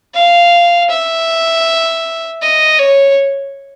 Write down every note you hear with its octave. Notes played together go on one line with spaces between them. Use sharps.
F5
E5
D#5
C#5